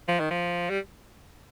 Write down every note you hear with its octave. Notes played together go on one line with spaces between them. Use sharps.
F3
D#3
F3
G3